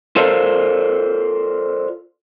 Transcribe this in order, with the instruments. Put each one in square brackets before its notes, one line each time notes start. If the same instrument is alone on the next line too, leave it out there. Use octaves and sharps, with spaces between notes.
[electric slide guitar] F4 A4 A#4 C5 D5 F5